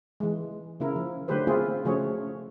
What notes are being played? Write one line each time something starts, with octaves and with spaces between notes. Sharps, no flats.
E3 G#3
C#3 A#3 E4 A#4
F3
D3 F#3 A3 G4 B4 C5
A#3 C4 E4 F4 G#4
C#3 F3 A3 F#4 G#4 C#5